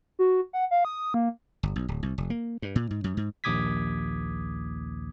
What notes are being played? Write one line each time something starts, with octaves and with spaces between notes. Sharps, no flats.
F#4
F#5
F5
D#6
A#3
G1
B1
D1
C2
F1
A#3
G2
A#2
G#2
F#2
G#2
A#1 D#2 D6 D#6 G#6 B6